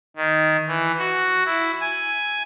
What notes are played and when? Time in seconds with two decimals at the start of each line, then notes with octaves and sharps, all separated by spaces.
0.16 D#3
0.68 E3
0.97 F#4
1.45 E4
1.80 G#5